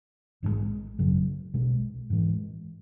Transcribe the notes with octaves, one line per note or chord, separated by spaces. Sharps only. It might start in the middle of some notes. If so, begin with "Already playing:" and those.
A#1 G#2 D#3 G#3
G#1 F#2 C#3 F#3
B1 B2 G#3
G#2 E3 G#3